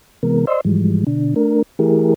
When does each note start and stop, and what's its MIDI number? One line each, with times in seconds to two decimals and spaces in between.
0.23 0.45 48
0.23 0.45 52
0.23 0.45 56
0.23 0.45 59
0.23 0.45 70
0.47 0.61 72
0.47 0.61 74
0.47 0.61 75
0.47 0.61 84
0.47 0.61 88
0.65 1.04 44
0.65 1.04 52
0.65 1.04 53
0.65 1.04 55
0.65 1.04 56
1.07 1.34 47
1.07 1.34 50
1.07 1.34 62
1.36 1.62 57
1.36 1.62 62
1.36 1.62 70
1.79 2.14 52
1.79 2.14 57
1.79 2.14 64
1.79 2.14 67
1.79 2.14 68
1.79 2.14 70